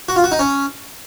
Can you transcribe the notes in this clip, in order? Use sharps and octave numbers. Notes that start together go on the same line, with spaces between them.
F#4
F4
F#4
D#4
C#4